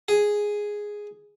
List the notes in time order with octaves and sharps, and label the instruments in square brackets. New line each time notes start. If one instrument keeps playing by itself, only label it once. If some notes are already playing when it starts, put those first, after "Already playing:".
[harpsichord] G#4